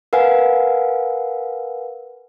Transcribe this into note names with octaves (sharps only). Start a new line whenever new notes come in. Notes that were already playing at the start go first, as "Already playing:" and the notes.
A#4 B4 F5 F#5 G#5